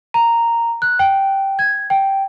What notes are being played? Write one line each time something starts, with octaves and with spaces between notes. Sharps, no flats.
A#5
F#6
G5
G#6
G5